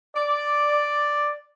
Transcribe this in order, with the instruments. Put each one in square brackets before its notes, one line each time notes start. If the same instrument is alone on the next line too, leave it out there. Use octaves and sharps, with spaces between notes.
[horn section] D5